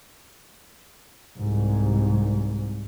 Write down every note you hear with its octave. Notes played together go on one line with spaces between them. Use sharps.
C2 G#2